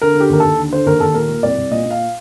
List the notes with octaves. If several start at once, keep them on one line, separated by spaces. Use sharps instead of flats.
D3 A#4
D3
G4
D#2 A#4
D#2 A4
D3
D3 C5
D#2 A#4
D#2 A4
A#2 A#4
A#2
C2 D5
C2
A#2 D#5
A#2
F5